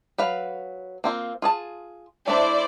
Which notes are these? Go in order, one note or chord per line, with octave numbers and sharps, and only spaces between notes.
F#3 B4 F5
A#3 C4 F4
F4 G#4 A5
A3 D4 E4 C5 D5